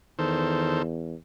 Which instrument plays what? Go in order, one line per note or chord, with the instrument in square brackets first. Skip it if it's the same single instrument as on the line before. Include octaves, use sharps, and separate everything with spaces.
[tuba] E2 [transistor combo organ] D#3 A4 C5